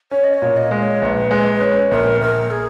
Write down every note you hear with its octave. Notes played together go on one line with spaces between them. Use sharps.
C#4 C#5
D#5
C#5
A#2
D#5
G#3
D#5
C#5
A#1 B4 C#5
G#3
C#4
A#1 A#4
A#1 A#4
G#4